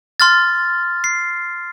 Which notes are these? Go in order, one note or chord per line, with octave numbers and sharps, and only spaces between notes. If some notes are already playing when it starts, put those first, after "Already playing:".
C6 F6 A6
C7